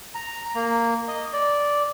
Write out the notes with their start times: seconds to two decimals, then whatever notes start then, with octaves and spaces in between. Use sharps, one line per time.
0.15 A#5
0.55 A#3
1.08 D#5
1.33 D5